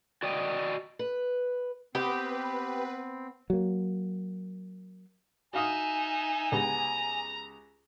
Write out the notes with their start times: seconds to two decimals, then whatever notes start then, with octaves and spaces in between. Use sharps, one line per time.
0.23 F#4 D5 D#5 G5
0.99 B4
1.95 B3 C4 G4 B4
3.50 F#3 A#3
5.53 D#4 F#4 E5 F5 G#5 D#6
6.52 C#2 B3 G4 A#5